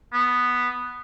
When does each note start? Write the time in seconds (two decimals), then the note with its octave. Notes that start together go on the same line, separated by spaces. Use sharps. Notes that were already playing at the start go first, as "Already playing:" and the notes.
0.13 B3